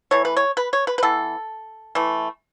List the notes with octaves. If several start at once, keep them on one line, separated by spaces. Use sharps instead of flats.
E3 A3 C#5
B4
C#5
B4
C#5
B4
B4
E3 B3 A4
E3 A3